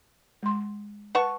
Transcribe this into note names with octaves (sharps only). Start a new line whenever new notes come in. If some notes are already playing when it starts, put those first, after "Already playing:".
G#3 C6
B4 F#5 A5 C#6